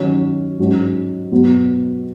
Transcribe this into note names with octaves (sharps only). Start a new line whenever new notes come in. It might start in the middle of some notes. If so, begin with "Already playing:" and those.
Already playing: D#3 F#3 C#4 F#4
G#2 F#3 C#4 F#4
B2 F#3 B3